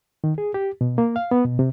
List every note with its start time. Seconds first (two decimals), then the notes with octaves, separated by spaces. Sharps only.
0.24 D#3
0.38 G#4
0.54 G4
0.81 B2
0.98 A#3
1.16 F5
1.31 B3
1.45 B2
1.59 C3